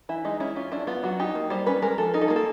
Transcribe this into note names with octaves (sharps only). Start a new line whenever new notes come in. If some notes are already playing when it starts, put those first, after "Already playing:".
E3 E4
G#3 D#4
C#4 E4
C#4 F4
D4 E4
B3 F4
F#3 F#4
D#4 G4
A#3
G3 C5
C#4 B4
G#3 A#4
F3 A4
D#4 A#4
A4
A#3 G#4
A4